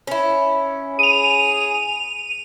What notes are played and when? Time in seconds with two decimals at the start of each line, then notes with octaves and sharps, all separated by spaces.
0.07 C#4 E4
0.99 G#4 D#7 F7